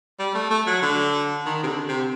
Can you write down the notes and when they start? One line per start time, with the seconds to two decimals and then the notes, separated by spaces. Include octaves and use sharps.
0.19 G3
0.34 A3
0.50 A3
0.67 F#3
0.82 D3
1.46 D#3
1.63 C3
1.67 D3
1.88 C3